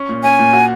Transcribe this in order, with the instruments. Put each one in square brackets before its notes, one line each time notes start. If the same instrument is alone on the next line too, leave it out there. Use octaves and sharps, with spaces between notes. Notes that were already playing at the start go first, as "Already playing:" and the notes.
Already playing: [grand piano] C#4
A#2
[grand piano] C#4 [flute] G#5
[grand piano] A#2
F#4